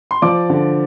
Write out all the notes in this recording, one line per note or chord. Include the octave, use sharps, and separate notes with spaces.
C6
F3 D5 D6
D3